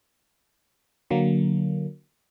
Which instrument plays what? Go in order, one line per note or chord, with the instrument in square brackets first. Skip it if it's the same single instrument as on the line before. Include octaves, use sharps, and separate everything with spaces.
[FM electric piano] D3 F#3 A#3